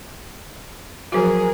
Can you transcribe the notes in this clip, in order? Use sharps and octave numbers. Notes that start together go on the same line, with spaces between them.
F3 F#3 F#4 G#4 A#4